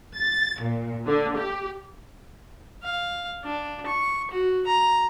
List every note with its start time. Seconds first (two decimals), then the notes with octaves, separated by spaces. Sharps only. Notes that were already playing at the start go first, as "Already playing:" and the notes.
0.16 A6
0.61 A#2
1.06 D3
1.36 G4
2.83 F5
3.44 D4
3.86 C#6
4.31 F#4
4.66 A#5